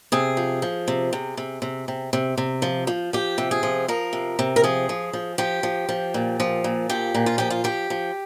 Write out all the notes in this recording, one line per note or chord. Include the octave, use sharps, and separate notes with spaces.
C3 G#4
F3
F3
C3
C3
C3
C3
C3
C3
C3
F3
F3
F3 G4
C3
G#4
F3
F3 A#4
C3
C3
A#4
F3 G#4
F3
F3
F3 G4
F3
F3
A#2
F3
A#2
F3 G4
A#2
F4
F3 G4
F4
F3 G4
F3